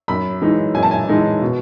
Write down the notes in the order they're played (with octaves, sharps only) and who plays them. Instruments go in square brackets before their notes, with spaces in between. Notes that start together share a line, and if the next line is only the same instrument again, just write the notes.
[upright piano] F#2 B5
E3 G#3 D#4
F#2 G#5
A5
G#5
E3 G#3 D#4
B2